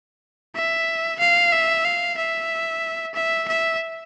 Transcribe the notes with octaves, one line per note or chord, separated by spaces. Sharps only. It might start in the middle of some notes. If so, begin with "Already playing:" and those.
E5
F5
E5
F5
E5
E5
E5